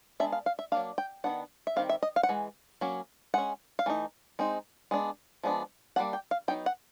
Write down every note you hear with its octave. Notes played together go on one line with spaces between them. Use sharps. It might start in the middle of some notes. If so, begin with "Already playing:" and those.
G#3 B3 D4 E5
F5
F5
E5
F#3 A#3 D4 F5
G5
D#3 F#3 B3 D4 F#5
E5
D#3 G3 C4 F5
E5
D#5
F5
F#5
E3 G#3
F#3 A#3 C#4
G#3 C#4 F#5
F5
E3 A3 D#4
G#3 C4 D#4
G#3 B3 D4
F3 G#3 B3 D4
G3 A#3 D4 F#5
G5
F5
F#3 B3 D#4 G5
F#5